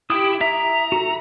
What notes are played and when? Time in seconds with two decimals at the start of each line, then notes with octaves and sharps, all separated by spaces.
0.10 E4 G4 G5 D#6
0.41 E5 A#5
0.53 E5
0.92 F#4 A4